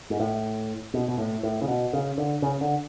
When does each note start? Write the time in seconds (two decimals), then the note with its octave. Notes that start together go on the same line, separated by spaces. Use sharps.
0.10 G#2
0.20 A2
0.94 B2
1.08 B2
1.18 A2
1.43 A2
1.62 C#3
1.68 B2
1.93 C#3
2.18 D3
2.42 C#3
2.61 D3